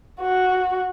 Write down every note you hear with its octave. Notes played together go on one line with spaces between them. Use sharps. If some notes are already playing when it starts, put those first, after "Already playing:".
F#4